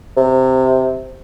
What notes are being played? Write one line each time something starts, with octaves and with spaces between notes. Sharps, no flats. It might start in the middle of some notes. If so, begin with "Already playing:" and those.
C3